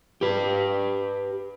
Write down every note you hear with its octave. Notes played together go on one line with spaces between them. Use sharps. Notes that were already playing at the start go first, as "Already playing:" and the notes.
G4 B4